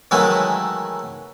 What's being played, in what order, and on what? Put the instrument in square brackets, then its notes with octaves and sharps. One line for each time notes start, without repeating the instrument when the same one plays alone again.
[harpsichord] D#3 E3 F#3 G#3 A3 E4